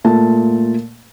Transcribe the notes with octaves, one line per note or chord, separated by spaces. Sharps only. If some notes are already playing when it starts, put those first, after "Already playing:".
A#2 A3 A5